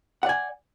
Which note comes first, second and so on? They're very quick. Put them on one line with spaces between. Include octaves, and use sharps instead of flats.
F#5 D5 G#5